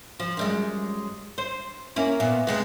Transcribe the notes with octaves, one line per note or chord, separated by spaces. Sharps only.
F3
F#2 G3 G#3
C5
A#3 C#4 E4
A#2 B3
C3 G#3 B3